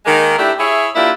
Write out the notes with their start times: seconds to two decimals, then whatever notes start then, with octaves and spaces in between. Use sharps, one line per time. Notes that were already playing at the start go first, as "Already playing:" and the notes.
0.06 D#3 G#3 A#3 A#4
0.38 A3 D4 E4 G4
0.60 E4 G#4 C#5 E5
0.95 A#3 D4 E4 F4 G4